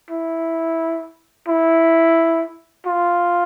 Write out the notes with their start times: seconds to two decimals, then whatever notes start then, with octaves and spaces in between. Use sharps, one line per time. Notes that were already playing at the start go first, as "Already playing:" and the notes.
0.10 E4
1.48 E4
2.86 F4